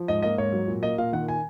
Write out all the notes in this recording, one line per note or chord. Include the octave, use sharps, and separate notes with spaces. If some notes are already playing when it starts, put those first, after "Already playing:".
Already playing: F3
G#2 D#5
A#3 D#5
G#2 C#5
F#3
A#2
A#3 D#5
A#2 F5
D#3 F#5
G#5